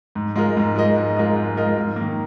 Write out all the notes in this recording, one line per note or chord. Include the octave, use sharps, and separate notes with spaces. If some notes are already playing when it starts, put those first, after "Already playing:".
G#2
G#3 F4 A#4 D#5
G#2
G#3 F4 A#4 D#5
G#2
G#3 F4 A#4 D#5
G#2
G#3 F4 A#4 D#5
G#2
D#3 A#3